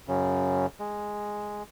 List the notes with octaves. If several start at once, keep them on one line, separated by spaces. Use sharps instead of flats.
F#2 C#3
G#3